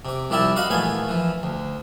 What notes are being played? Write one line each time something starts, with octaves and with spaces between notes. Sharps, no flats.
C3 D6
C2 F3 E4 G4 D5 E5
D#4 F#4 F5 F#5 B5 D#6
A#1 E3 A3 B3 F5 G#5
E3 F3
D2